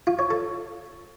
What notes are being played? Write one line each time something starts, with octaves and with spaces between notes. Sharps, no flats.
F4
C#5
A4